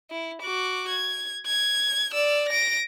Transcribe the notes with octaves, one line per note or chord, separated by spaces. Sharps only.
E4
F#4 D6
G#6
G#6
D5 E6
A#6 D7